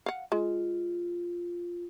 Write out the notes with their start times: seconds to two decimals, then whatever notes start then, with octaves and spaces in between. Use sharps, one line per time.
0.06 F5 F#5
0.32 G#3 F4